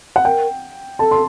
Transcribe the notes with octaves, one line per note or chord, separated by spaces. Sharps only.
F#5
A#4 G5
A4 A5
C6